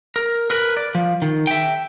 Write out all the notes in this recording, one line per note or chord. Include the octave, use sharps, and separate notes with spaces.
A#4
A#4 B4
D5
F3
D#3
E5 G5